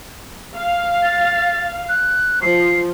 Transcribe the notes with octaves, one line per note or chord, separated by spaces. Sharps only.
F5
A6
F#6
F3 C7